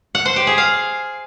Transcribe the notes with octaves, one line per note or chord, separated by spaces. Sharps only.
F#5
C5
G4
G#4
F5